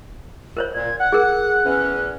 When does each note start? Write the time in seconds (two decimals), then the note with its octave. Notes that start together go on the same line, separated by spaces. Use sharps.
0.57 A#4 C5 C#5
0.75 A#2 G#6
1.00 F#5 F#6
1.12 G#4 A#4
1.65 E2 E3 C#4